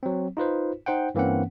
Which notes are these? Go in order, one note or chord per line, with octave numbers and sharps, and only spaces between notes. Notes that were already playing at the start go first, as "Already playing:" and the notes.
F#3 C4
D#4 F4 B4 C5
D#4 C5 F#5 G5
G2 E3 A#3 C4 C#4 F#5